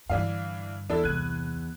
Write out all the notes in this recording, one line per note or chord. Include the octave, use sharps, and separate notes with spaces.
G2 D3 E3 D4 F5
E2 D4 E4 A4
C2 F#6 G#6 D#7